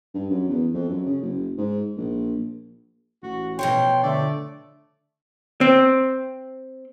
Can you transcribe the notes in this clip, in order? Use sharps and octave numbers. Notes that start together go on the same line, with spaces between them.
G2
F#2
E2
F2
F#2
C#3
F#1
G#2
A#1
A1 F#4
B2 F3 C#5 G5 C6
D3 A3 D5
C4